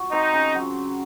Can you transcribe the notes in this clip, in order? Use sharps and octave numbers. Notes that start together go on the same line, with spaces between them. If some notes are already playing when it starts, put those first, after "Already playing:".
Already playing: F#4
C4 D#4
C#3
F#3